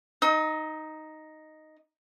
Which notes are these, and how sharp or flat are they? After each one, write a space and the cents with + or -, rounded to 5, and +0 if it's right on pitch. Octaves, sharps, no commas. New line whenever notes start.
D#4 +0 D#6 +45